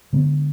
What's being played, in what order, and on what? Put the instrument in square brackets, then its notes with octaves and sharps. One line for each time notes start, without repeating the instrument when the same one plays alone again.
[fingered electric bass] D3 G#3 B3